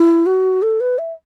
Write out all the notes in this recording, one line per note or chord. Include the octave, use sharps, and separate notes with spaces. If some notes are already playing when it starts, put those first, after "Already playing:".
Already playing: E4
F#4
A4
B4
E5